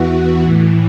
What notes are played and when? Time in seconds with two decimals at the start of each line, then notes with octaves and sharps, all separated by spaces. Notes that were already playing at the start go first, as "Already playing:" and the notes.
Already playing: E2 E3 F#4
0.42 A2 E3